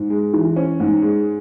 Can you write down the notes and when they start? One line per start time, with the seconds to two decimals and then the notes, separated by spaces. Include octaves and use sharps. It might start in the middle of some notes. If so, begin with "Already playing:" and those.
Already playing: G#2
0.10 G#3
0.34 E3
0.56 C#4
0.80 G#2
1.02 G#3